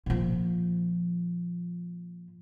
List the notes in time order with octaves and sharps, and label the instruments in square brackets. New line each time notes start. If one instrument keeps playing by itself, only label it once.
[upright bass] A#2 F3